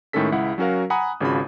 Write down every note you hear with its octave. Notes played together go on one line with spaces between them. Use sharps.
A2 D#3 G#3 C#4 A4 B6
C#2 E4 F#5
F#3 C#4 F#4 A#4 F5
F#5 G#5 A#5 B5 D#6 F#6
G#1 C#3 F4 F#4 B5